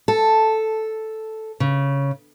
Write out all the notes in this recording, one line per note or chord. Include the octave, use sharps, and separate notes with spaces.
A4
C#3